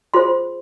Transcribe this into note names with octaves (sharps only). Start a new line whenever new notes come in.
F4 G#4 C5 C6